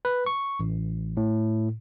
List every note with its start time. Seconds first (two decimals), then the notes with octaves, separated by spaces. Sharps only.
0.05 B4
0.26 C#6
0.60 A1
1.17 A2